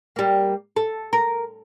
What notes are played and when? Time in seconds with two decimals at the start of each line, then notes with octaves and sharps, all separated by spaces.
0.16 G3 A#3
0.76 A4
1.13 A#4